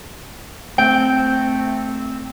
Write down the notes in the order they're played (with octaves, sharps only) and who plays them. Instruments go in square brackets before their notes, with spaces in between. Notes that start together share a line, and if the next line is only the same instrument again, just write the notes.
[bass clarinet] A3 [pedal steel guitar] C4 [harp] G5